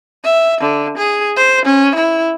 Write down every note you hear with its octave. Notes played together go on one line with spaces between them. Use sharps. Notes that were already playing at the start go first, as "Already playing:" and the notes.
E5
D3
G#4
C5
C#4
E4